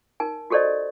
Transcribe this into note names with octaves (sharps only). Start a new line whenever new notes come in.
D#4 A#4 G#5
F#4 G4 A4 C5 D5 D#5